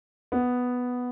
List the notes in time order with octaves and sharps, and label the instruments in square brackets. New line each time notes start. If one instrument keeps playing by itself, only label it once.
[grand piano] B3